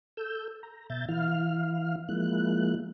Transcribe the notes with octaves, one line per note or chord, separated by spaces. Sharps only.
A4 E6 G6
A#5
B2 E5 G6 A6
E3 E4 F5 F6
F3 G#3 A#3 E4 F#6